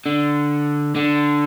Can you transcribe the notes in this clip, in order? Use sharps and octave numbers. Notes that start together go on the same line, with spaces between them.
D3
D3